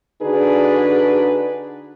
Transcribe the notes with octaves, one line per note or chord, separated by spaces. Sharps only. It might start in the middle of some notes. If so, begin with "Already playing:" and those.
D3 D4 D#4 F#4 G#4 B4